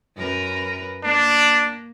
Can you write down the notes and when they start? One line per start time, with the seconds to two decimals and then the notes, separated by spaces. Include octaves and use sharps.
0.17 F#2 A#4 B4
1.03 A#3 D4